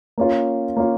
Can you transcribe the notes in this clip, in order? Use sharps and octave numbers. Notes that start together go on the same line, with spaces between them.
A#3 C#4 F4
A#3 C#4 F4